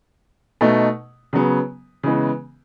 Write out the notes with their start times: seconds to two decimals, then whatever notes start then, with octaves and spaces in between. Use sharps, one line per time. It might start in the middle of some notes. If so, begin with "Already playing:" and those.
0.61 B2 A3 D#4
1.33 C#3 F#3 B3
2.03 C#3 E3 G#3 B3